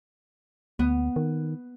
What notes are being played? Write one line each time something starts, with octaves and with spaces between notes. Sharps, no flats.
D2 B3
D#3